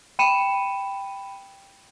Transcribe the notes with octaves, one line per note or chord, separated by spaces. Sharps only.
G5 B5 C#7 D#7 E7